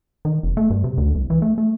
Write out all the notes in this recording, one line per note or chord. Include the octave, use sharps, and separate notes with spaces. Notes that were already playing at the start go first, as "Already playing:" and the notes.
D#3
F1
A3
G2
C3
D2
C2
E3
A3
A3